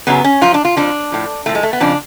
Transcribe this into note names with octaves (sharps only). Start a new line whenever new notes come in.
F#2 C#3 F#3 B3
C#4
F#2 F3 F4
D4
F4
F2 F3 D4
A2 F3
A2 F3 A3
G#3
A3
B3
F2 C#3 F3 D4